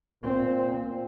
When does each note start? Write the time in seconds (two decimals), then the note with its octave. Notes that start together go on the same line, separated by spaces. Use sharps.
0.24 A#2 C4